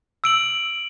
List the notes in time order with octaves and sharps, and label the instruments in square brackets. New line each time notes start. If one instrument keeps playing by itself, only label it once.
[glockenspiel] E6 D7 F#7